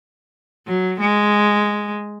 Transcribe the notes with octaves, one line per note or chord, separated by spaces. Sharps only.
F#3
G#3